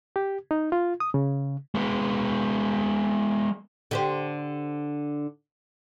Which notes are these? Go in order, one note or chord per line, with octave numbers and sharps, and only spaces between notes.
G4
D#4
F4
D#6
C#3
G#3 B3
D3 G4 C5